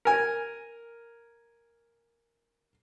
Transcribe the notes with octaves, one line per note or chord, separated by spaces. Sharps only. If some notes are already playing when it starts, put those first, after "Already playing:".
A#4 G#5